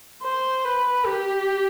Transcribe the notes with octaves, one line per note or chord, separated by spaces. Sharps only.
C5
B4
G4